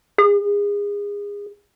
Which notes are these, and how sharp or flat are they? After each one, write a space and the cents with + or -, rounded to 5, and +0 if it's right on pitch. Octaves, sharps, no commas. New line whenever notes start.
G#4 -30